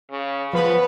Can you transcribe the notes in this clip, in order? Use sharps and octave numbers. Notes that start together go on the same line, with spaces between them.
C#3
F3 B3 B4 B5